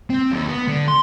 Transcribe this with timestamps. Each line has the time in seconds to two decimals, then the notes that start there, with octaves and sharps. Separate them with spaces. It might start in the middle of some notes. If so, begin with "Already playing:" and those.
0.10 C4
0.32 D#2
0.49 B3
0.68 D3
0.88 C6